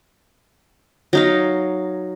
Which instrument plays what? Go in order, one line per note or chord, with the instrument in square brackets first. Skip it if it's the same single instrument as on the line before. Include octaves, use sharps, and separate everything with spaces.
[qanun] F#3 D#4 F5